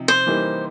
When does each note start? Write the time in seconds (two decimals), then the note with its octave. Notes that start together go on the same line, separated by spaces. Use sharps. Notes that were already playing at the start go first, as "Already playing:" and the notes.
Already playing: C3 F3 D#4
0.08 C5
0.27 E3 G3 A#3 D#4